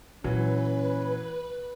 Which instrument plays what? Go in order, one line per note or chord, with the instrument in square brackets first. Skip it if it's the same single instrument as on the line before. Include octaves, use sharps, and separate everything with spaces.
[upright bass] A#2 [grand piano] E3 F#3 [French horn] C#4 [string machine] B4